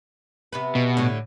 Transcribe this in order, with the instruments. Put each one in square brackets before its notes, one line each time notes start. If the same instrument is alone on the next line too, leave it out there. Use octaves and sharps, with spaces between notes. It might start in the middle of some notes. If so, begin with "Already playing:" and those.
[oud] C3 B3 B4
[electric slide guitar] B2
[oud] A2 D3